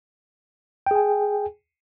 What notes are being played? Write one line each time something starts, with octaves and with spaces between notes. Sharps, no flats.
G#4 G5 G#5